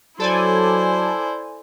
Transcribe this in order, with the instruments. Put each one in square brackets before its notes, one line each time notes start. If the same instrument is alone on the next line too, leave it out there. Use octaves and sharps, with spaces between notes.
[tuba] F#3 [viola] E4 C5 [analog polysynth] A4 D5 G#5